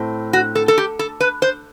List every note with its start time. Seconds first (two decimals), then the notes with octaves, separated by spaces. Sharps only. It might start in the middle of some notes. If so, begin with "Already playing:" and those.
Already playing: A2 C4
0.33 F#4
0.55 A4
0.68 A4
0.78 G4
0.99 A4
1.20 B4
1.42 C5